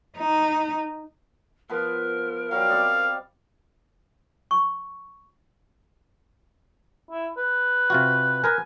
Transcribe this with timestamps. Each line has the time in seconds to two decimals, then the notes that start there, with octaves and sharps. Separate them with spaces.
0.18 D#4
1.69 F3 B3 A#4 B4
2.51 F#3 G3 F5
2.69 C4 D5 D#5
4.51 C#6
7.11 E4
7.37 B4
7.90 C3 F4 F#4
8.44 A#4 B4 G#5 A#5